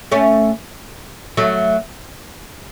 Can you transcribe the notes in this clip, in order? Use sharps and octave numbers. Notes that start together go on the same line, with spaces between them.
A3 C#4
F#3 A3